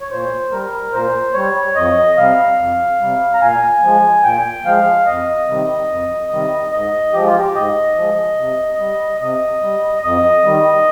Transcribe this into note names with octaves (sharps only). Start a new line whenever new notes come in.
C#5
A#2 C5
G3 A#4
A#2 C5
G3 C#5
F2 D#5
C3 G3 F5
F2
C3 G3
A#5
A#2 G#5
F3 G#3
A#2 G5
F3 G#3 F5
F2 D#5
C3 D#3 G3
F2
C3 D#3 G3
G#2 D#5
F3 G#3 G4
F4
G4
G#2 D#5
F3 G#3
C3
G3
C3 D#5
G3
F2 D#5
D#3 G3